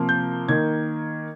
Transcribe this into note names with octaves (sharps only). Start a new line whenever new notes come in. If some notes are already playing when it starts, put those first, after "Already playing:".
Already playing: C3 F3 A#3
G6
D#3 A#3 G#6